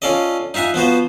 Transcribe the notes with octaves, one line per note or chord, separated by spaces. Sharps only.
C#4 F4 A4 D5 D#5
D#4 F4 E5 F#5 G#5
F3 B3 F#4 C5